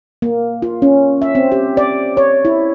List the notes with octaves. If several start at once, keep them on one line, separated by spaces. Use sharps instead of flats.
A#3
F4
C#4
E5
C4
G4
D5
C#5
E4